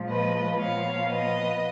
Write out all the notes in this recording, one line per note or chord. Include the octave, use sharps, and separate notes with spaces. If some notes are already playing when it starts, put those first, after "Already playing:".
Already playing: A#2 F3 G#3
B4 D#5
A#2 F3 B3 C#5 F5
B4 D#5